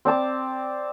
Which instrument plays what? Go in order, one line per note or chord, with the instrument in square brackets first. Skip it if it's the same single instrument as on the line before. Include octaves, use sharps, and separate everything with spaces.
[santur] C4 D5 A5 D6